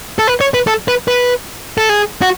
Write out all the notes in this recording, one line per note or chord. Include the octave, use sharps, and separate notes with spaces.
A4
B4
C#5
B4
A4
B4
B4
A4
G#4
F#4